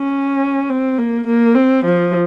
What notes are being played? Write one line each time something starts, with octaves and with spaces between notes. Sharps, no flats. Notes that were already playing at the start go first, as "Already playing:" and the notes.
Already playing: C#4
C4
A#3
A#3
C4
F3